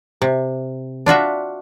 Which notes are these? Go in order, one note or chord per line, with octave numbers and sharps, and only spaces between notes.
C3
D4 F4 F#4 E5